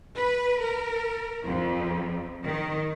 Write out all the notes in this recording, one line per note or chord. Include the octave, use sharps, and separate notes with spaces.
B4
A#4
F2
D#3